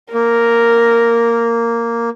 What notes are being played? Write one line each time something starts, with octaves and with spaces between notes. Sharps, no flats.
A#3 A#4